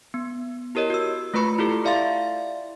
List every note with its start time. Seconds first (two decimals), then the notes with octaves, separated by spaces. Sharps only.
0.14 B3
0.75 E4 G4 A#4 C#5 D#5
0.90 F#4 E6
1.34 A3 F4 B4 B5 C#6 C#7
1.58 E4 F4 G4 A4
1.84 E4 D5 E5 F5 C6 A6